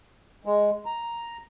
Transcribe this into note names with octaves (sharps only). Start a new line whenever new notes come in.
G#3
A#5